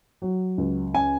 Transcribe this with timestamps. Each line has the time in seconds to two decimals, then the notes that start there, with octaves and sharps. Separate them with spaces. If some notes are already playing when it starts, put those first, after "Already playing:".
0.22 F#3
0.58 C#2
0.94 C#4 G#5